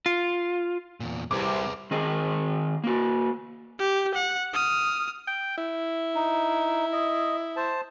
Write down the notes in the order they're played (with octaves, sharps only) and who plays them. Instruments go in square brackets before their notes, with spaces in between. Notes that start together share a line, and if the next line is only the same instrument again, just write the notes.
[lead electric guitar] F4
E2 A#2
[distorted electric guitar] C2 [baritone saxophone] C3 [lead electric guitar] G#4 B4 [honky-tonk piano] D6
[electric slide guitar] D#3 C4 G#4 D#5
A#3 F#4
[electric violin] G4
F#5
D#6 F6
[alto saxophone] G5
E4
[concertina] D#4
D#5
C5 A5